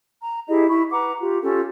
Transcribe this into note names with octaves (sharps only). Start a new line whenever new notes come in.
A#5
E4 G4 G#4 D#5
E4 B5 C#6
B4 F#5 A#5 D6
F4 G4
C#4 F4 G4 A4